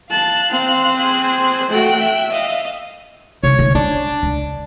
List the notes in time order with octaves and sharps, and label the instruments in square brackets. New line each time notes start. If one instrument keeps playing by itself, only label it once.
[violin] F5 F#6 [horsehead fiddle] A5
[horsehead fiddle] C4 C5
[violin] G#4 F#6
[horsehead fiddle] A3 F#4 [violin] G5 F#6
[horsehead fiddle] E5
[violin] D#5 F5
[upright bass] C#3 [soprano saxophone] C#5
[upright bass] D3 A3
[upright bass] C#4 [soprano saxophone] D4
[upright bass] C#2